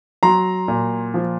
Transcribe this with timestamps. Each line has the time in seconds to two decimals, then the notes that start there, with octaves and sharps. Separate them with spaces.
0.23 F#3 A#5 C6
0.68 A#2
1.14 F3